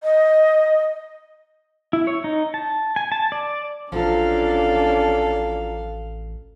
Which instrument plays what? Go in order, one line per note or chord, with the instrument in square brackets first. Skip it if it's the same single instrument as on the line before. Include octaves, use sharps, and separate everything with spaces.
[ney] D#5
[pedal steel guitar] E4
C#5
D#4
A5
G#5
A5
D5
[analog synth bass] A1 [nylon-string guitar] F3 F#3 F4 [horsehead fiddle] C#4 D4 [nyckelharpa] A4 F5